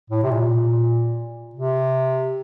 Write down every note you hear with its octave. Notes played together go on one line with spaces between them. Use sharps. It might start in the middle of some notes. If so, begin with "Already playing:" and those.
A2
C3
A#2
C3